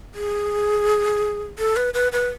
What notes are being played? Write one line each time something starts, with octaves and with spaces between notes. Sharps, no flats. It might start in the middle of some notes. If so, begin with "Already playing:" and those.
G#4
A4
B4
B4
B4